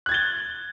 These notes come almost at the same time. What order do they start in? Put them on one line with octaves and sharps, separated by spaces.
F#6 G#6 A6 G7